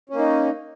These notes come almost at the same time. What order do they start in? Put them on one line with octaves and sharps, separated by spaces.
C#4 A#3 D#4